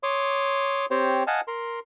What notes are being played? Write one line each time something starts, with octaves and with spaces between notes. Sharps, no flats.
C#5 C6 D6 D#6
C4 G4 C5 C#5
D#5 F5 F#5 G#5 A5
A#4 C6